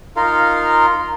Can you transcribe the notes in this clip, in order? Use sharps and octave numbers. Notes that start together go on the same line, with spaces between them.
D#4 F4 A#4 F5